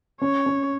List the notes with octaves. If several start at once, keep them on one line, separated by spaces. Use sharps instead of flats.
C#4 C#5
C#4